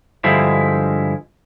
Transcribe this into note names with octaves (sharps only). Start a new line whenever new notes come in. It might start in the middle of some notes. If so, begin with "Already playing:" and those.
G2 D3 F3 G#3 E4